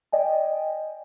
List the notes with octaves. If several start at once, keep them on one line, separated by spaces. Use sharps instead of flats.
D5 D#5 G5 G#5